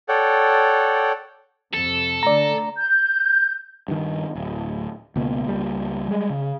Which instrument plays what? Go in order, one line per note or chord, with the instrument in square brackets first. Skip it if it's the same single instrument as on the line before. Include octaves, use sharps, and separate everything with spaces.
[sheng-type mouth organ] A4 C#5 D5 F#5 G5
[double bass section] F2 C3 [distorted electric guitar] A4
[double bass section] D3 A3 [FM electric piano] D5 A#5
[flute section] G6
[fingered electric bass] G2 D#3
D1
C#2 B2 A#3
C#2 G3 A#3
G3 G#3
C#3